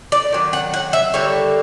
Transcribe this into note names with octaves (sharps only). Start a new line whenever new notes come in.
D5
D#3 F#3
F#5
F#5
E5
D3 G3 A#3 C#5